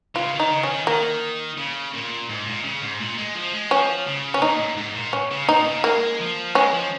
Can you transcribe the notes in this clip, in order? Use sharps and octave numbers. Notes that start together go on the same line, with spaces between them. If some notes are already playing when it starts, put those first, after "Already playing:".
C#3 F4
D#3
D#4
C#3
C#4
D#3
D#3 A#3
C#3
A#2
G#2
A#2
C#3
G#2
A#2
G#3
F3
G#3
F3 C#4
C#3
C#4
A#2 D#4
G#2
G#2
A#2
C#4
C#3
A#2 D#4
C#3
G#3 A#3
F3
G#3 C#4
F3